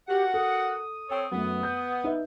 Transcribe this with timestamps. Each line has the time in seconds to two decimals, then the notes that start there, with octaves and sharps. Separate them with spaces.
0.08 F#4 G4 A#4 F#5
0.34 A4 D#6
1.09 C4 A4 C#5
1.32 F#2 A3 B3
1.63 G6
2.04 D#4 B4 E5